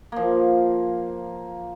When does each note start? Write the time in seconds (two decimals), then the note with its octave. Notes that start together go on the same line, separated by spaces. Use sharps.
0.12 F3 A#3